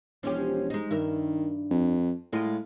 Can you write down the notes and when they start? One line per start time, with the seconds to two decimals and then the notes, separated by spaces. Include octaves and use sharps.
0.23 E1 F3 C#4 G4
0.70 G#3 D#4
0.91 G2 D#3 A#4 E5
1.71 F2
2.33 A2 G#3 F4 D#5